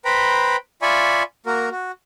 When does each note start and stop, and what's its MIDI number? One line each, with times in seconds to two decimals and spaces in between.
0.05 0.56 71
0.05 0.56 72
0.05 0.56 79
0.05 0.56 82
0.05 0.56 83
0.82 1.23 65
0.82 1.23 74
0.82 1.23 76
0.82 1.23 80
0.82 1.23 83
0.82 1.23 85
1.46 1.69 58
1.46 1.69 66
1.46 1.69 70
1.71 1.91 66